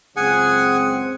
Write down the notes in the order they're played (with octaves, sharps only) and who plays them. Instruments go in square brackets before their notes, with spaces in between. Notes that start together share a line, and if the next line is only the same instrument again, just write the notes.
[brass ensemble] C#2 F#2 C4 [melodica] G#4 F#5 G#5